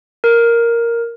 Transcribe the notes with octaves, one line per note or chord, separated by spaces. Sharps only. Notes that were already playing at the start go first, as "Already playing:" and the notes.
A#4